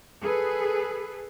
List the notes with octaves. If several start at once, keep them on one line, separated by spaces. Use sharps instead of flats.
G#4 A4 B4